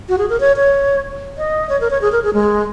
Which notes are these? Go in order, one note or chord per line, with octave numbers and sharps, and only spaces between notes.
F#4
G#4
A#4
C#5
C#5
D#5
C#5
A#4
C#5
G#4
A#4
G#4
G#3